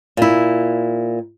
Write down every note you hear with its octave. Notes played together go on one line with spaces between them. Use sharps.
A#2 E4